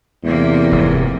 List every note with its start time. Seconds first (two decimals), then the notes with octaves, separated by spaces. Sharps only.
0.24 E2 C3 A#3
0.72 F1 G#2